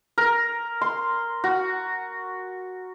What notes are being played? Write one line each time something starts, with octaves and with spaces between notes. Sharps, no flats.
A#4
C6
F#4